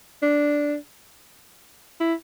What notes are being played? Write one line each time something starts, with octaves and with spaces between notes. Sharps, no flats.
D4
E4